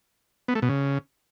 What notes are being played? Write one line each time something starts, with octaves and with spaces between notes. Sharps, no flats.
B3
A3
B2
C#3